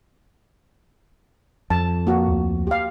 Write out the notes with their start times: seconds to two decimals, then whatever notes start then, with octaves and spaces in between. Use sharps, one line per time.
1.70 F2 A5
2.07 A#3 F#4
2.28 D2
2.67 G4 F5